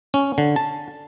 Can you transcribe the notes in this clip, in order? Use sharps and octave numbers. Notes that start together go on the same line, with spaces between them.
C#4
D3
A5